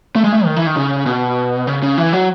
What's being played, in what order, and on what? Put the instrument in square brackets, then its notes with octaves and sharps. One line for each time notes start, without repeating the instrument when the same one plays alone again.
[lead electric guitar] A3
G#3
A3
D#3
E3
D#3
C#3
B2
C#3
C#3
E3
F#3